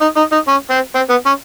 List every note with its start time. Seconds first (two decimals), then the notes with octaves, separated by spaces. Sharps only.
0.01 D#4
0.17 D#4
0.32 D#4
0.48 C#4
0.71 C4
0.95 C4
1.10 B3
1.26 C#4